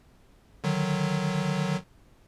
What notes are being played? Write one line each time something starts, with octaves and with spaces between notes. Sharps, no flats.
D3 D#3 F#3